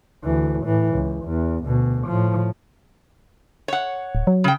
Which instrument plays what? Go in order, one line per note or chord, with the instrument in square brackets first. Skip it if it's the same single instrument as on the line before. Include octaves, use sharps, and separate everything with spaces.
[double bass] D2 E3
A2 E3
C#2
E2
D2 B2
A2 F3
[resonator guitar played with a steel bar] C#5 F#5
[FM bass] D1
F#3
[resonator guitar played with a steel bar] C#3 G5